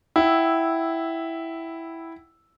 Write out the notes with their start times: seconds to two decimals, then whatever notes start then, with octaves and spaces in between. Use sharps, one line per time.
0.16 E4 F#5 G5 E6